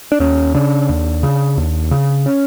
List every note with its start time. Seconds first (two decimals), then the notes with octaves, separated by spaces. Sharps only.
0.12 D4
0.20 D#2 C#4
0.54 C#3 D4
0.89 D#2
1.23 C#3
1.58 D#2
1.91 C#3
2.26 C#4